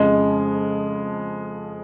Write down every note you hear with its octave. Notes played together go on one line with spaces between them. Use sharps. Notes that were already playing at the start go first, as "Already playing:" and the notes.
Already playing: F2 C#3 F3 G#3